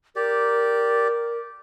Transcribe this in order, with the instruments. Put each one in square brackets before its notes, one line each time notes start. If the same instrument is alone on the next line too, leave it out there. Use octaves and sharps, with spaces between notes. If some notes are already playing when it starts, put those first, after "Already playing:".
[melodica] G4 D5 [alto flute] A#4